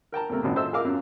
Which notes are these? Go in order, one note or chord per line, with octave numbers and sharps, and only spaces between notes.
A#4 G5 A5 A#5
E2 C3 A3 A#3
G#1 F#2 A#2
F4 A4 C5 D#5 E5 E6
G#4 A#4 F5 D6
F#2